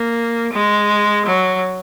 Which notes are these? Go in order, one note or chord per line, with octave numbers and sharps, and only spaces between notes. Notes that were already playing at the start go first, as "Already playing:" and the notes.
Already playing: A#3
G#3
F#3